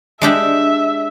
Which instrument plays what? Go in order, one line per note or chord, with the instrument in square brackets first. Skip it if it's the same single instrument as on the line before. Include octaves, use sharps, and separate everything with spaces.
[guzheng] G#3 D4 G4 [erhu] E5